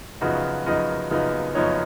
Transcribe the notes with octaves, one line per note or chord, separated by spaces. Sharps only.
F#2 C#3 F3 B3 D#4 F#4
F#2 C#3 F3 B3 D#4 D#5
F#2 C#3 F3 B3 D#4
F#2 C#3 F3 B3 D#4 C#5